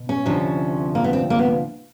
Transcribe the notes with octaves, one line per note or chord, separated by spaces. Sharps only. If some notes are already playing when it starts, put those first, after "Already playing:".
Already playing: B2
C#4
D2 C3 F3
A#3
B3
C4
A#3
B3